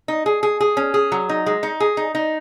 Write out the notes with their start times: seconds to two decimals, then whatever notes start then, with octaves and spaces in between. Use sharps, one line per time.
0.08 D#4
0.26 G#4
0.43 G#4
0.60 G#4
0.77 C#4
0.94 G#4
1.12 F#3
1.29 D#4
1.46 G#3
1.63 D#4
1.80 G#4
1.97 D#4
2.15 D#4